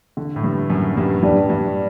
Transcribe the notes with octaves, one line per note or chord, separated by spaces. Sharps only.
D3
A2
G2
F#2
G2
G2 G3 D4 G4
G2